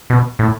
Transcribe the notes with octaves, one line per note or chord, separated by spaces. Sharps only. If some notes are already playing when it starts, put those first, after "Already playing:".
B2
A2